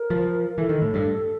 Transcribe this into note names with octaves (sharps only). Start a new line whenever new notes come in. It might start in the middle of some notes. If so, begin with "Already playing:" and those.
Already playing: A#4
F3
E3 A4
D#3
A2
G2